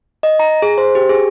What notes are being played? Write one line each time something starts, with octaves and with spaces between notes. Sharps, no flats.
D#5
A#5
G#4
C5
G4
G#4